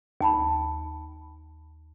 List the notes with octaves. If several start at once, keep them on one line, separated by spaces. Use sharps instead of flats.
D#2 A5 B5